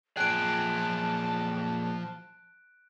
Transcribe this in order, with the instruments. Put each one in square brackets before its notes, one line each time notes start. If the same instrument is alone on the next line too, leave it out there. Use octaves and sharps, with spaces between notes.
[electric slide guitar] A#2 G#4 [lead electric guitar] F3 G5 [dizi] A5 [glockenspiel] F#6 D7